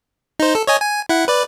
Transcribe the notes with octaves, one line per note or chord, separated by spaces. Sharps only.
D#4 C5
A4
C#5 D#5 G#5
G#5
E4 F#5
B4 D5